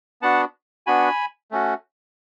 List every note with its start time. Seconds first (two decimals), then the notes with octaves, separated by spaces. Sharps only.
0.22 B3 D4 F#4 F#5 A5
0.87 B3 D4 F#4 G#5 B5
1.51 A3 C#4 F#4